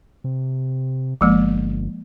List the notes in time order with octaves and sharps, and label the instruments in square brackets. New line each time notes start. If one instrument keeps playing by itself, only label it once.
[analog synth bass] C3
[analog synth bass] G1 [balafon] F3 G#3 A#3